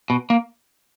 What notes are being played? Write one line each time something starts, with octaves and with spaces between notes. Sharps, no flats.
B2
A#3